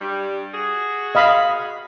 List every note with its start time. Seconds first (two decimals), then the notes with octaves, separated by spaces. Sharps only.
0.01 G2 G3
0.54 F#4 G#4
1.15 D#5 F5 B5